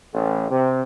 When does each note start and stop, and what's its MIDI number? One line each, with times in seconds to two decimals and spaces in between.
0.13 0.48 33
0.50 0.83 48